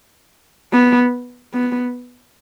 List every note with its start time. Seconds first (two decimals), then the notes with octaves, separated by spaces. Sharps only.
0.73 B3
1.53 B3